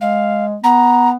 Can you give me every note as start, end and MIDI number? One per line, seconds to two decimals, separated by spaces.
0.01 0.57 56
0.01 0.45 77
0.63 1.15 59
0.63 1.09 82